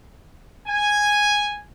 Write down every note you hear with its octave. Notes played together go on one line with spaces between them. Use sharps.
G#5